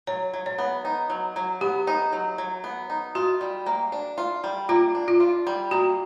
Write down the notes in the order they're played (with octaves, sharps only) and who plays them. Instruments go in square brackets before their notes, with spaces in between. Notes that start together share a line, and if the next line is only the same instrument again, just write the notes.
[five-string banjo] F#3 [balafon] C#5
[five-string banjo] F#3
[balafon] C#5
[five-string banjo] B3
D#4
F#3
F#3
[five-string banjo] B3 [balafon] G4
[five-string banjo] D#4
F#3
F#3
B3
D#4
[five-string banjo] F4 [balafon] F#4
[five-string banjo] G3
A#3
D4
F4
G3
[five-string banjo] A#3 [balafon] F4
[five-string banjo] D4
[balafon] F4
[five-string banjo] F4
G3
[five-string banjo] A#3 [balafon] F#4